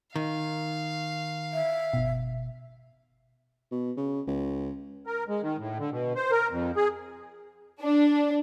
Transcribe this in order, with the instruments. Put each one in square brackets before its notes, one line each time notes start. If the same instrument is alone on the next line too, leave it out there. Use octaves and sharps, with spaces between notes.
[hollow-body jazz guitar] D#3 [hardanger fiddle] F5
[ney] E5
[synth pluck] G1 B2
[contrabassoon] B2
C#3
C#2
[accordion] A#4
G#3
D#3
A2
D3
B2
C5
A#4
F2
G#4
[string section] D4